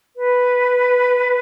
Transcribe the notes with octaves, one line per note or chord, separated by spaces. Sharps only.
B4